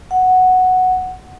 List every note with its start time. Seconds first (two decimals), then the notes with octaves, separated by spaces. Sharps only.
0.11 F#5